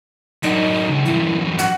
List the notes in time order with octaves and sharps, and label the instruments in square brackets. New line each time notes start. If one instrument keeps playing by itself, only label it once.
[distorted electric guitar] F#2 D4 [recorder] D#4
[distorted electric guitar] C#2
[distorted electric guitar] E2 G2 [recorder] E4
[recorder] F#5